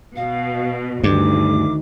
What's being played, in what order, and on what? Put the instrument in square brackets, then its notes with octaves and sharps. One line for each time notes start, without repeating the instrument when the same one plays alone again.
[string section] B2 [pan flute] F5
[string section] D2 [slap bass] G2 [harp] D#3 [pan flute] D6